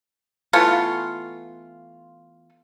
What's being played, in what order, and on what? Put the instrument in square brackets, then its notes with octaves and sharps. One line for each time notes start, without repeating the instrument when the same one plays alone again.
[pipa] E3 A3 B3 F4